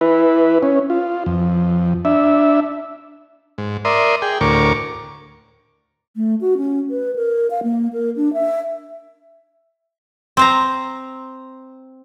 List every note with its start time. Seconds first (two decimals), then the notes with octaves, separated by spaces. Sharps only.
0.01 E4 B4
0.63 C#4
0.90 F4
1.26 F2
2.05 D4 E5
3.58 G#2
3.85 A#4 D5 E5 C6 D#6
4.22 G#4 G5
4.41 D2 A2 A#4 C#6 D6
6.16 A3
6.41 F#4
6.57 C#4
6.90 B4
7.16 A#4
7.51 F5
7.63 A#3
7.93 A#4
8.16 D4
8.33 E5
10.37 C4 C5 A#5